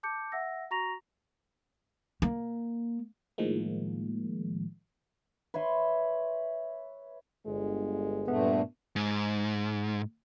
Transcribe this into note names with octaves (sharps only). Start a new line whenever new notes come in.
A5 D6 G6 C#7
E5 F#5 E6 A#6
F#4 A#5 C#6 A#6 F7
A#3
A2 D#3 F3 G#3 A#3
B4 C#5 E5 C6
G1 G#3
G2 A#2 A3 B3
G#2